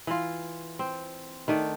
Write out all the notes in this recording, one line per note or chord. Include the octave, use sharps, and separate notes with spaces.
E3 F4
C4
D#3 A3 D4 D5